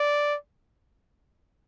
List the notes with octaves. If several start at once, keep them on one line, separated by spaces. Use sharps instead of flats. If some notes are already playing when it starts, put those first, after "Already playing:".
Already playing: D5